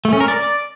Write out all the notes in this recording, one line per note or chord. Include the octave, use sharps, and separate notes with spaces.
A3
C#4
A#4
D5